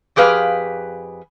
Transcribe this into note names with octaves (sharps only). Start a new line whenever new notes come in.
F2 G4 G#4 B4 F5